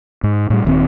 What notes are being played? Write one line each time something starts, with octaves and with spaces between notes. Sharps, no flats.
G#2
A2 G3
D#1 D#2 C4